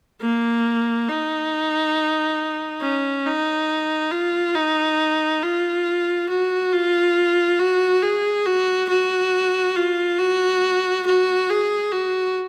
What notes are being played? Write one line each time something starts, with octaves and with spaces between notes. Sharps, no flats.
A#3
D#4
C#4
D#4
F4
D#4
F4
F#4
F4
F#4
G#4
F#4
F#4
F4
F#4
F#4
G#4
F#4